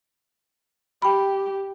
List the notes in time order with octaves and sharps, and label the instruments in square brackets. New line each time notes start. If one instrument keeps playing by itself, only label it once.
[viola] G4 [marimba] G5 B5